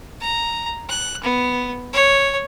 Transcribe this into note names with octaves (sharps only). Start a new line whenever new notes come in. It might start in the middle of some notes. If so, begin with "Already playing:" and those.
A#5
F#6
B3
C#5